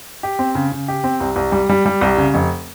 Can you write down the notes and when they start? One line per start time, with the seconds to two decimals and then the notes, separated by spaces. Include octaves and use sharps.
0.23 G4
0.39 C4
0.55 C#3
0.72 C#3
0.88 G4
1.04 C4
1.20 C2
1.36 C2
1.52 G3
1.69 G3
1.86 G3
2.01 C2
2.18 C#3
2.34 F1